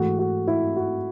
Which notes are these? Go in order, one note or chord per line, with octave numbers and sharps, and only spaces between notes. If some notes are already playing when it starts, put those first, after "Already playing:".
Already playing: G#2 E3 A3 F#4
F#4
E4
F#4